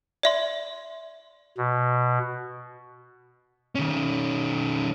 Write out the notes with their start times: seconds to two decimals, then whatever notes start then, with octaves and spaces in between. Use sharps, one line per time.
0.23 D5 E5 C6
1.57 B2
3.75 D#3 C#4